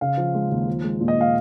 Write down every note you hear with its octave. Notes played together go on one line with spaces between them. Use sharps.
C#3 F5
F3
G#3
D#2
F3
G#3
A#2
D#5
A#2 F5